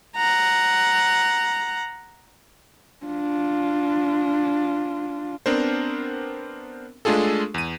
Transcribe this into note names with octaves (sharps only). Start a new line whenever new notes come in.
F#5 A#5
D4 F4
B3 C4 D4 A#4 C5
G#3 A3 D4 F4 G#4 A4
E2 D#7